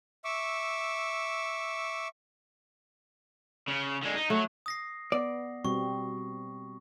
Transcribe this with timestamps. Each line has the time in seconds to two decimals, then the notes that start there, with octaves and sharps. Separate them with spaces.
0.25 E5 C#6 D6 E6
3.68 C#3
4.03 D3 G#3
4.15 D#4
4.30 F#3 A3
4.66 D#6 A#6 C7
5.12 B3 D5
5.65 B2 G3 C4 C#6